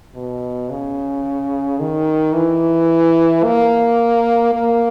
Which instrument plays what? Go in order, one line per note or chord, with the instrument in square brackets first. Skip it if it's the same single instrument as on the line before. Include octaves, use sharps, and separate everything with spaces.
[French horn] B2
C#3
D#3
E3
A#3
A#3